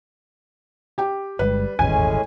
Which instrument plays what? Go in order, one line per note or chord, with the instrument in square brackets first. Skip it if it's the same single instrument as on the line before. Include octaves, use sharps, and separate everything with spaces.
[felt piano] G4 G5
[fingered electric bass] G1 G2 G#3 [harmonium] G3 [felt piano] B4
[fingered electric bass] D#1 G#1 E2 [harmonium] A2 G#3 C#4 [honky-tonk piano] G#5